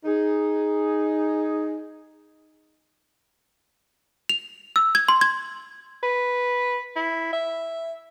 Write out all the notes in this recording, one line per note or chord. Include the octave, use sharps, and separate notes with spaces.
D#4 G#4
F7
E6
G#6
C6
G#6
B4
E4
E5